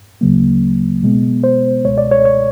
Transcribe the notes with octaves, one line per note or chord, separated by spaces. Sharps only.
D2 C#3 F#3 A#3
B2 G#3 B3
C5
C#2 B2 G#3 C#5
D5
C#5
C#5